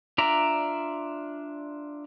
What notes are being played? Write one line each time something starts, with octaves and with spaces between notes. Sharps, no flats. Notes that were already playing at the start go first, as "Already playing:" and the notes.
D4 F4 D5 E5 A#5